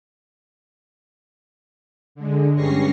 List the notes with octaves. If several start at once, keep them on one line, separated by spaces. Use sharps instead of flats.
D3 G#3
G2 G3 C#4 C#6 A#6 C7